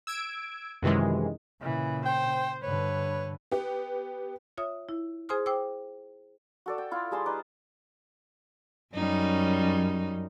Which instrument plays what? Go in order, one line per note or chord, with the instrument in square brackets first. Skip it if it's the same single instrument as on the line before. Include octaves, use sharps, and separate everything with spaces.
[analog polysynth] E6 G#6 D7
F#2 C3 D#3 E3 G#3
[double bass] A#2 C#3 [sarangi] E3
[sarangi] C5 [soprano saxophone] G5
[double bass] G2 D3 [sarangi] B4 [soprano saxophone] C#5
[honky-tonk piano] B3 G4
[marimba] F4 C#5 E5 D#6
E4
G#4 C5 G#5 C6 D#6 F6
C5 G5 D6 E6
[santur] F#4 A4 D5
G5
E4 F4
G3 G#4 A5 C6
D#4 B4 D5
[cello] F#2 [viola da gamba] G3 C#4 D#4